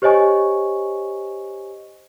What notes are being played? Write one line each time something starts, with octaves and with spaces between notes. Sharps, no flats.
G4 C5 C#5 D#5 G#5 C#6